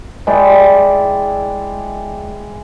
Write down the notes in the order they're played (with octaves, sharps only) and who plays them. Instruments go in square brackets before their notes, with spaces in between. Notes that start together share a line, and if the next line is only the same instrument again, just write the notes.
[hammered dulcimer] G#3 E4 D5 G5